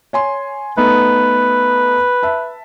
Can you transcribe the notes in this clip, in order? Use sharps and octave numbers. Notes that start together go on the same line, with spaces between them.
C#5 G#5 C6
A3 B3 D#4 B4
E5 A5